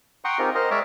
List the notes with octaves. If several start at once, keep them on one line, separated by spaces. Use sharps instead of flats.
F#5 G5 A#5 C6 C#6 D#6
C4 D#4 F4 G4 G#4 A#4
A#4 C5 D#5
G#3 A#4 C#5 D5 E5 D6